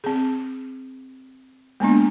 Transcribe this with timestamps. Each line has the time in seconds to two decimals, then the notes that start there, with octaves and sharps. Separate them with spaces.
0.04 C4 G#4
1.80 G#3 A#3 B3 D4